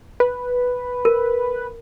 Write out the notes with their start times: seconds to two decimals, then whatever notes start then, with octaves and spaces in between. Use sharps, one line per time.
0.20 B4
1.05 A#4